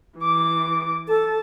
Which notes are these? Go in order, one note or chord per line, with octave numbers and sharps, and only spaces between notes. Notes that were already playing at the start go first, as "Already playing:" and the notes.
E3 D6
A4 A5